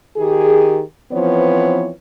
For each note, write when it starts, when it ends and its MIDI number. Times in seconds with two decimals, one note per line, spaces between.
0.16 0.81 51
0.16 0.81 67
0.16 0.81 68
1.12 1.89 52
1.12 1.89 53
1.12 1.89 59
1.12 1.89 60
1.12 1.89 73